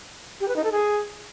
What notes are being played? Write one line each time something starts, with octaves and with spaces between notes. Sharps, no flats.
G4
B4
D#4
A4
G#4